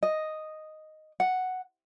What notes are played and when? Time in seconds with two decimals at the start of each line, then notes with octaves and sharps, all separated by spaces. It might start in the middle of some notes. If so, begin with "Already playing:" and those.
0.03 D#5
1.20 F#5